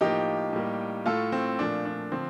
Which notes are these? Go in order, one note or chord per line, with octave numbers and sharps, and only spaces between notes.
A2 F3 A#3 D#4 G4
A2 G3 A#3
A2 A3 F4 A4
C4
A#2 F3 A3 D4
D4
D3 F3 C4